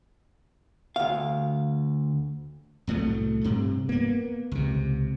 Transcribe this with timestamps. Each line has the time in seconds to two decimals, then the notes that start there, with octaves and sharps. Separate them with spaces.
0.96 D2 F5
2.87 C2 A2 F#3 A3
3.44 G2 C3
3.89 A#3 B3
4.52 C#2 C3